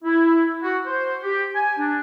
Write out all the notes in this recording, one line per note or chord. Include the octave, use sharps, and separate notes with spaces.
E4
F#4
C5
G4
G#5
D4